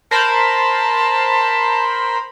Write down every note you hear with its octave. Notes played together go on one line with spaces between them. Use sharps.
A#4 C5 A5 B5